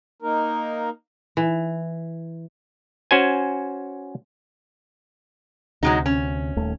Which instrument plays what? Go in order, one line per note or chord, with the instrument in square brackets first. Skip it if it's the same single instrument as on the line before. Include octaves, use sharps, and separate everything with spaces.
[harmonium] A#3 D#4 A#4
[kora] E3
[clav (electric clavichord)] C#4 F#4 C5 G#5
[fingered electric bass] D2 C3 [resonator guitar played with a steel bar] F#3 G#3 D#4
[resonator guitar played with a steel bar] C#4
[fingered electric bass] D#1 D#2 A3